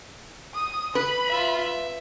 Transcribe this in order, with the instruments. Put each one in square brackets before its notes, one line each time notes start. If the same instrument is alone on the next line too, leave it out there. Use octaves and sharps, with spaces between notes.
[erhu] D#6
[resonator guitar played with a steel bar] B4 [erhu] B5
[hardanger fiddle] F4 E5
E5